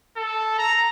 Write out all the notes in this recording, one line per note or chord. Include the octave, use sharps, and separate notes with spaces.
A4
A#5